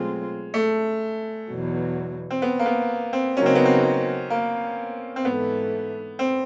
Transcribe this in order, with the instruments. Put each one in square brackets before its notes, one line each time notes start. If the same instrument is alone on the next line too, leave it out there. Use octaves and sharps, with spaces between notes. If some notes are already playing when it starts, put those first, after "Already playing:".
Already playing: [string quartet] B2 F#3 A3 C4 F4 [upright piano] G#3
[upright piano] A3
[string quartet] E2 B2 F#3
[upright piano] C4
B3
A#3
B3
C4
[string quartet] C#3 F#3 A#3 D#4 [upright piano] C#4
[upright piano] C4
B3
C4
A#3
C4
[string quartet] G#2 E3 A3 [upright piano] B3
[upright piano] C4